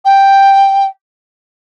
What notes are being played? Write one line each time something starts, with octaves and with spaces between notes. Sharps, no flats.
G5